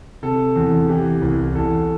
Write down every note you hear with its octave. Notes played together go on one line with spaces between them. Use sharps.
C3 A4
E2
E3 G4
C2
E2 A4